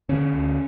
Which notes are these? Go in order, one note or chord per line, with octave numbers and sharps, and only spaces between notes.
D3 C#4
D2